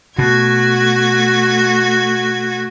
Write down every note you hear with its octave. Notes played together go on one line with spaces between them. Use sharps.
B2 A3 F#4 G#6